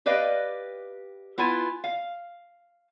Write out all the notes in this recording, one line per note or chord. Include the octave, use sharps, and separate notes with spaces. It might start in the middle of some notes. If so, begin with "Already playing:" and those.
G4 B4 D5 D#5 F5
B3 E4 F4 G#5
F5